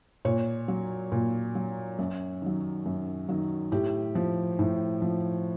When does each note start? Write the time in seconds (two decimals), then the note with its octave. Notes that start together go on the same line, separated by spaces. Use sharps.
0.25 A#2 C#5
0.68 F#3
1.12 A#2
1.55 F#3
1.99 F#2
2.42 D#3 F#3
2.86 F#2
3.29 D#3 F#3
3.72 A2 G4
4.15 F3
4.59 A2
5.02 F3